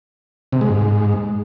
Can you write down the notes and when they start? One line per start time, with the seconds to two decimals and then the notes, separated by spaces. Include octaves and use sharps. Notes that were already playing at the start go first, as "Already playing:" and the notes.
0.53 C3
0.61 G#3
0.70 G#2